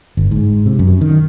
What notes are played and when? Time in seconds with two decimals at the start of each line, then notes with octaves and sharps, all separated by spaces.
0.17 G1
0.31 G#2
0.66 C3
0.79 F#2
1.01 D#3